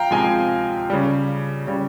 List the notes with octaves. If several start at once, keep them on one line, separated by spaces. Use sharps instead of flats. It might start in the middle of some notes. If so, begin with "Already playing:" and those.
Already playing: F3 F5 G5 A#5
C3 F3 G#3 G#5
C#3 G3
C#3 G3